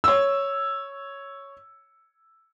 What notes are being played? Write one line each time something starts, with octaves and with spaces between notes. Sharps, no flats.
C#5 E6